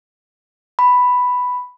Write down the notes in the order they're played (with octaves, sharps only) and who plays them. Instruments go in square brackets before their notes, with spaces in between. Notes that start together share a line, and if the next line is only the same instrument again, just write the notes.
[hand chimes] B5